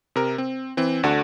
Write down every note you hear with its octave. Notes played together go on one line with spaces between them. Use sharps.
C3 A#4
C4
E3 C4
D2 D4 F#4 A4